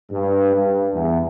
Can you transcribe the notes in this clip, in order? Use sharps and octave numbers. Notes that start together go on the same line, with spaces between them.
G2
G2
E2